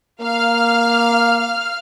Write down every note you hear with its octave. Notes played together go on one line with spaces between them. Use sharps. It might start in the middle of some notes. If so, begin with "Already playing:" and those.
A#3 F5 F6